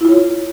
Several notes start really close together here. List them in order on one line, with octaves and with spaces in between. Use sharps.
E4 F4 C#5